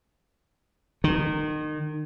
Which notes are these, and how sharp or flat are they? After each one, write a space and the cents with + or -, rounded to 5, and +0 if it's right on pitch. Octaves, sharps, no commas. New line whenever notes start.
D#3 -30